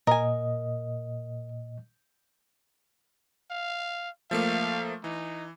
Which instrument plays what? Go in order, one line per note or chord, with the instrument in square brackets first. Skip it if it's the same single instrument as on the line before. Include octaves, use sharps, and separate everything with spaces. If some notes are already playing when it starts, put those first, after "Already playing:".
[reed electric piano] A#2 D#5 [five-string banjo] A#4 G#5
[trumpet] F5
[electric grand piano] F3 A3 A#3 [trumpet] F5
[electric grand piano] E3 [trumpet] D#4